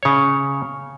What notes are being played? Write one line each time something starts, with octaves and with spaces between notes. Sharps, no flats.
C#3 C#5